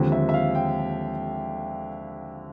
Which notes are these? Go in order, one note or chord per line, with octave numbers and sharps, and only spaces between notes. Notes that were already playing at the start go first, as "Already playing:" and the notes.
Already playing: D#2 D3 F3 G#3 C4
E5
E5
F5
G5